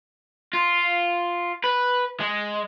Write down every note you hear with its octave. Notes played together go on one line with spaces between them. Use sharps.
F4
B4
G#3